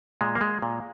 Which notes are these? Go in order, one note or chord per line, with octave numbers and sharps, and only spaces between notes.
A#2 G#3
A#3
G#3
A#2